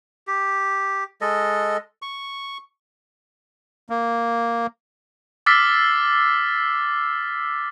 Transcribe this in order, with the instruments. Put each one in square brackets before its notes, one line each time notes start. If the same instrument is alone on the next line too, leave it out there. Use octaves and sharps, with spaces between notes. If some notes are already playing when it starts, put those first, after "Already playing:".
[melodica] G4
G#3 A4 D#5
C#6
[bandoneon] A#3
[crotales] D6 E6 F6 A6 B6 C7